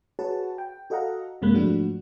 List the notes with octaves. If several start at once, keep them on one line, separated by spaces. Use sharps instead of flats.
F#4 G#4 B4 C#5 F#5 A5
G5
F#4 A4 D#5 F5 F#5 A#5
F#2 C3 G#3 A#3 B5 F#6
G#2 F3 F#3 A3 D4 F#4